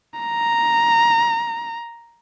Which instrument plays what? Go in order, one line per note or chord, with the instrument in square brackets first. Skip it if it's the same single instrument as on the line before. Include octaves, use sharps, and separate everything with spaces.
[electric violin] A#5